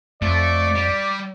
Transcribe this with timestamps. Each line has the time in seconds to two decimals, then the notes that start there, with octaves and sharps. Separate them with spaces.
0.22 F2 A3 D5
0.75 G3